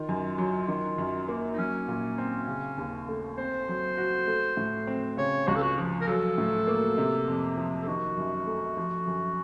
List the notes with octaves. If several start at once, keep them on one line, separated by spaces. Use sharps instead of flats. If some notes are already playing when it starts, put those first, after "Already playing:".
Already playing: D#3 F4
F#2
F#3
D#3
F#2
A#3
D#4
F#3 C#4
A#2
C4
C#3
D#2
A3
C4 C5
F#3
F#4
A3
A2
C4
C#3 C#5
C#2 F#4
A4
F#4
F3
A#4
F#3 A4
A2
A#3
C3
F2
F3
A4
D#3 F#4
F#2
A3
F3
F#2